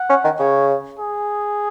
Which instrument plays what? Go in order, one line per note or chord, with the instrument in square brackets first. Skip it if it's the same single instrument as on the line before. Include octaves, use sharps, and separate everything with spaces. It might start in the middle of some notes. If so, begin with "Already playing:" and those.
Already playing: [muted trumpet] F#5
[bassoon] C#4
D#3
[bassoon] C#3 [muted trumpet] C#5
[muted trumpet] G#4